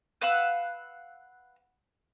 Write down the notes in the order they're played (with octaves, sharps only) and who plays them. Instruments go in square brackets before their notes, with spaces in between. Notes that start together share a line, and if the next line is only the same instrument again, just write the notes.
[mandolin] B4 F5 F#5 E6